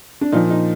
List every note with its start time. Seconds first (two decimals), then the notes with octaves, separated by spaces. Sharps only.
0.21 D4
0.32 A#2 F3 D#4
0.50 D#4